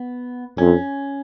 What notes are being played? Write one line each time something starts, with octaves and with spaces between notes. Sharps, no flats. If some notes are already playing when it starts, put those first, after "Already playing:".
Already playing: B3
F2 C#4